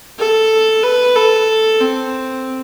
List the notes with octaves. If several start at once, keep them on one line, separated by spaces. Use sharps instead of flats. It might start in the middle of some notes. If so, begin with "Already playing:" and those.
A4
B4
A4
C4